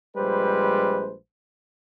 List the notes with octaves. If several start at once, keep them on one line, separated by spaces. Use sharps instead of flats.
A#1 G3 G#3 B4 C5